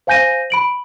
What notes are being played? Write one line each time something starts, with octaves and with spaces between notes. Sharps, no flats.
C5 F5 G#5 G6 A#6 D#7
B5 D7 F#7